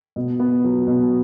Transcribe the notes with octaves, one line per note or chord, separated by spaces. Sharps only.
B2
B3
F#3
B2